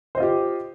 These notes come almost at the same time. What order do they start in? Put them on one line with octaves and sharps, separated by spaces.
C5 D#5 F4 G4